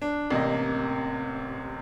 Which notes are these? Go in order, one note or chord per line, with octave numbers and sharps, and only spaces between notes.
D4
A1 C3 A#3 D#5